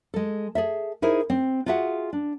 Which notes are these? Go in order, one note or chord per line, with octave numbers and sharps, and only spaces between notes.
G#3 A4
G#4 A4 E5
D#4 E4 G#4 A#4 C5
C4
F4 F#4 G#4 E5 F#5
D4